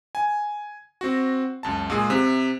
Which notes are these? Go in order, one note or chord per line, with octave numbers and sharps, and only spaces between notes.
G#5
C4 F#4
C#2 F#2 A5
A#2 G#3 G#4
C3